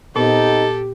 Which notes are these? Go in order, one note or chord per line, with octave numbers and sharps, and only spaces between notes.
A#2 B3 C4 D#4 G4 A4